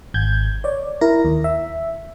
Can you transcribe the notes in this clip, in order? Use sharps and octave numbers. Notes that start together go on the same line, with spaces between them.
G#1 G6 G#6
C#5 D5
E4 A#4 A#6
D#2
E5